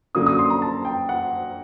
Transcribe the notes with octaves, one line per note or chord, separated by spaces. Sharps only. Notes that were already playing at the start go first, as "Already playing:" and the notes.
F#2 D3 F#3 A#3 D#6
D#6
C6
A#5
A5
G5
F#5